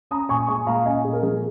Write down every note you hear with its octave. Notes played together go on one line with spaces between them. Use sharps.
C#4 A#5 D#6
A#2 G#5 C#6
G#3 G#5 C#6
A#2 F5 A#5
C#4 D#5 G#5
A#2 G#4
A#4
F3 G#4